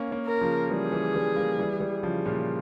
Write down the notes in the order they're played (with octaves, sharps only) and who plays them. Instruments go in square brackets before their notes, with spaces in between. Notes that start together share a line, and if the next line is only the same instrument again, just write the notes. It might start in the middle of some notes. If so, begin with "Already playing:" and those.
Already playing: [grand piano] A#3 C#4
A#3 C#4
[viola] A#4
[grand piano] C#3 F3
[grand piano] E3 G3 [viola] G#4
[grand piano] E3 G3
E3 G3
G3 A#3
E3 G3
E3 G3
C#3 F3
A#2 C#3